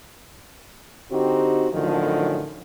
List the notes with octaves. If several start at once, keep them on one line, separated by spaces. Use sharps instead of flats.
D3 C4 D#4 F#4 G4
F#2 A2 D3 D#3 F3